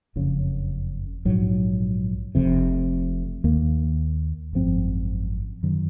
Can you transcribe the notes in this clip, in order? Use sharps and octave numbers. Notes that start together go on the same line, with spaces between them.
F#1 F2 C#3
A#1 G#2 F#3
F1 F2 C3
D#2 D#3 A#3
G#1 F#2 F3 C4
F#2 D#3 F#3